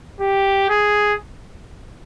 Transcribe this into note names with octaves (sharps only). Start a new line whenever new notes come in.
G4
G#4